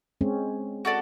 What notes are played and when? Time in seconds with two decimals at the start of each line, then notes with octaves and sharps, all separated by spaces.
0.21 G#3 C4 C#4
0.85 F#4 A4 D5